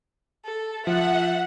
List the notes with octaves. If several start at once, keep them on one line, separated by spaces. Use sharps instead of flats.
A4
F3 E5 F#5